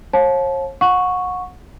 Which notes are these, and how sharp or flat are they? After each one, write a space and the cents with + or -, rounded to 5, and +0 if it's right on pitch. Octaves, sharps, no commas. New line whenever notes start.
C#5 -45 F5 +30 A5 -25
F#5 -30 C#6 +0